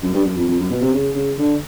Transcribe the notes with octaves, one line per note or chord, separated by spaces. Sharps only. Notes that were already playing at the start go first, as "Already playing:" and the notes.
F#2
G2
F#2
F2
F2
F#2
B2
C3
C#3
C#3
D3